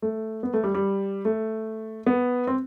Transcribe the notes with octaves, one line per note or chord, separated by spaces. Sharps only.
A3
B3
A3
G3
G3
A3
B3
C4